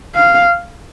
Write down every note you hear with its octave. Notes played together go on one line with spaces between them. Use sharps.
F5